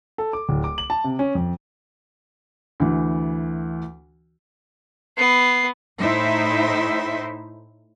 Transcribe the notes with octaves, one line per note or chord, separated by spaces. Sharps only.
A4
D6
D1
D6
F#7
A5
C3
C#4
F2
D2 E3
B3 C7
A2 D#4 E4 C5 E5